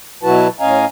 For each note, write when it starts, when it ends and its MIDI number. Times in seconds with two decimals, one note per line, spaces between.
0.23 0.48 47
0.23 0.48 54
0.23 0.48 64
0.23 0.48 66
0.23 0.48 71
0.23 0.48 81
0.60 0.85 45
0.60 0.85 61
0.60 0.85 75
0.60 0.85 77
0.60 0.85 80
0.60 0.85 82